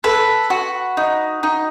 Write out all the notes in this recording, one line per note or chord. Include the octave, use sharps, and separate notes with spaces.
A4 B4
F#4
D#4
D#4